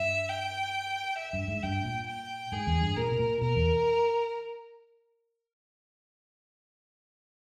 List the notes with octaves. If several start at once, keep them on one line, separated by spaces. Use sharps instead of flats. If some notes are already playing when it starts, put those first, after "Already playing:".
Already playing: G2 E5
G5
E5
G2
G#2
G2 G5
A#2
G5
G#2 G#4
E2
G2
A#2 A#4
B2
A#2
B2 A#4
E2